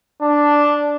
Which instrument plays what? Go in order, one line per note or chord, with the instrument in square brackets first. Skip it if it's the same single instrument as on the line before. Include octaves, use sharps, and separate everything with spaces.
[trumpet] D4